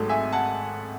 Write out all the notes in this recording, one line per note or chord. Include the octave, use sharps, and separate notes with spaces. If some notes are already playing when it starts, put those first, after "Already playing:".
Already playing: G#1 G#2 F#3 A3 A4
E5 G#5
F#5 A5